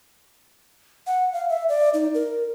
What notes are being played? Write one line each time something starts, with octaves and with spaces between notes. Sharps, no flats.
F#5
F5
E5
D5
D#4
A#4